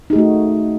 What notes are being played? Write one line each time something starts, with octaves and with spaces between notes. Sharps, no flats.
A3 D#4 F#4 G#4